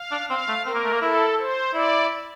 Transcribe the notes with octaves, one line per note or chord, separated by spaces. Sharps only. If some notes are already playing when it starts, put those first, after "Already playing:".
Already playing: F5
D4
C4 F5
A3
C4 A#4
A#3
A3
A#3
E4 A4
C5
E4 D5